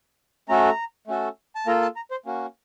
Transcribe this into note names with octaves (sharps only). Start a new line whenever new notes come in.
A3 C#4 F#4 A4 A#5
A3 C#4 F#4 A4
A5
A#3 F4 A4 A#5
A5
A#5
C5
A#3 C#4 F#4